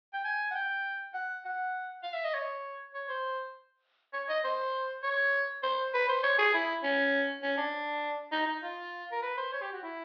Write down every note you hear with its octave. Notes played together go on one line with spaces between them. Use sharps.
G5
G#5
F#5
G5
F#5
F#5
F5
E5
D#5
C#5
C#5
C5
C#5
D#5
C5
C#5
C5
B4
C5
C#5
G#4
E4
C#4
C#4
D4
D#4
D#4
F4
A#4
B4
C5
C#5
G4
F#4
E4